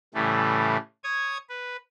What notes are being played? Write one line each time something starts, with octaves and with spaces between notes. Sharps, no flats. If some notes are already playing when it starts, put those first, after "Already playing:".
A2 C#3 E3 G3 A3
C#5 D#6 G#6
B4